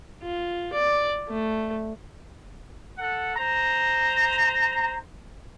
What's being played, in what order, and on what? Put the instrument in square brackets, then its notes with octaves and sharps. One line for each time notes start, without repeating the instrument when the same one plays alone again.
[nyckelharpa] F4
D5
A3
[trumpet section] A4 F#5
C5 A#5